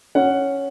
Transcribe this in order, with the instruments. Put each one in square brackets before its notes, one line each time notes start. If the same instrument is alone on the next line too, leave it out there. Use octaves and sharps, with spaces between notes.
[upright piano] C#4 F#5